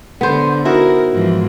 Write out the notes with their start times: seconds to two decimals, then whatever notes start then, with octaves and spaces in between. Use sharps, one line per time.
0.21 D3 B3 C5
0.65 D#4 E4 F#4 A#4
1.13 G#2 E3 F3